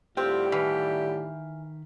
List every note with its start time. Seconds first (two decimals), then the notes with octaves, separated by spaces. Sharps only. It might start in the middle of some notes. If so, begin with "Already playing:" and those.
0.17 A2 D3 G3 C4 F4 G4
0.52 D#3 E3 F5 B5